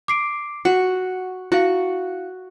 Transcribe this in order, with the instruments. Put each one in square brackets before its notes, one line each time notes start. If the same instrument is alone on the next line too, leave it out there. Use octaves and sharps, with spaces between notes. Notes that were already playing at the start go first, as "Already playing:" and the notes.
[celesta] D6 C7 D7
[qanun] F#4 [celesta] F#5
[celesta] E4 F5 [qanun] F#4